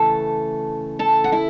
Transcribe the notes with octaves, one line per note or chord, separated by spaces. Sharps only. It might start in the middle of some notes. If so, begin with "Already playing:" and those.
Already playing: C#3 E3 A3 A4 A5
A4 A5
F#5
E4 E5